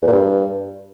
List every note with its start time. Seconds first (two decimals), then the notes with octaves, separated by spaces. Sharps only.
0.02 E2
0.07 A#2
0.12 G2